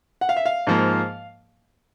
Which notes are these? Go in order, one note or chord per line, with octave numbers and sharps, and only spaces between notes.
F#5
F5
E5
F5
G#2 F3 A#3